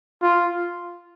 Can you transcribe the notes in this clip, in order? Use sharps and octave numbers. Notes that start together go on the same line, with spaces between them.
F4